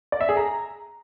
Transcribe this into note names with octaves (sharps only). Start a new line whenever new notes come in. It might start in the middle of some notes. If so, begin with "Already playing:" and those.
D5
E5
G#4
A#5